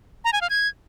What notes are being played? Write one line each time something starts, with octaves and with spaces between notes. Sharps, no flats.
A#5
G#5
F5
G#6